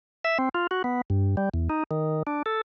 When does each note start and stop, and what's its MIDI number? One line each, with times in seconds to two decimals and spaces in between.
0.25 0.38 76
0.39 0.49 60
0.54 0.67 65
0.71 0.82 66
0.84 1.01 59
1.10 1.36 43
1.37 1.49 55
1.54 1.69 40
1.70 1.83 63
1.91 2.23 51
2.27 2.42 62
2.46 2.61 69